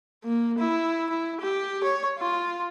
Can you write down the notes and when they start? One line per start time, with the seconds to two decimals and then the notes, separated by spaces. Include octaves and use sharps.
0.24 A#3
0.58 E4
1.09 E4
1.41 G4
1.83 C#5
2.19 F4